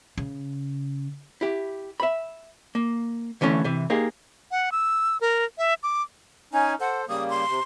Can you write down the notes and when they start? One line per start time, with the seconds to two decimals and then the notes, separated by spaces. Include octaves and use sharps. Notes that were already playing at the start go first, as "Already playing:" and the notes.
0.18 C#3
1.41 E4 G4
2.00 E5 B5
2.75 A#3
3.41 D3 E3 A3 C#4
3.64 C3 E3
3.90 A#3 D#4 G4 G#4
4.51 F#5
4.72 E6
5.21 A#4
5.58 E5
5.83 D6
6.53 C#4 D#4 G#5
6.80 A4 C5 F#5
7.08 C#3 G3 A#3 D#6
7.30 C6
7.48 C3